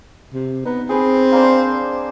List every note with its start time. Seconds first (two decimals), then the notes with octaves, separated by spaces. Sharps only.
0.34 C3
0.65 B3 D#4
0.89 C4 G#4 B4
1.32 A#3 D4 C5